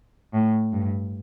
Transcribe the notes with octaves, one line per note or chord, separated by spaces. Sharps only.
A2
G2